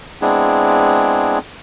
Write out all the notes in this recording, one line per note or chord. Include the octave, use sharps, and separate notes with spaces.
G#3 B3 C4 D4 E4 G#4